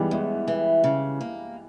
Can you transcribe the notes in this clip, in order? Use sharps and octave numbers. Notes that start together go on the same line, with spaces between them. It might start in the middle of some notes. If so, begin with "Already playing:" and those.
Already playing: E3 G3 G#3 B3
E2 G#3
E3
C#3
A#3